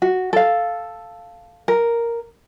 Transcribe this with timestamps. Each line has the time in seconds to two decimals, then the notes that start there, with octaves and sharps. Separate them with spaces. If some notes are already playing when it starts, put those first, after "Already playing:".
0.02 F#4
0.33 A4 F5
1.68 A#4